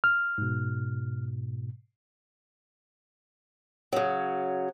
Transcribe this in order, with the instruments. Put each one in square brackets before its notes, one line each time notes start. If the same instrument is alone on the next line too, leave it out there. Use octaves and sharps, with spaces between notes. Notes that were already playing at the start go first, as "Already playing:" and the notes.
[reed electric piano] F6
[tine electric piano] G#2 B2
[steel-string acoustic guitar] C#3 F#3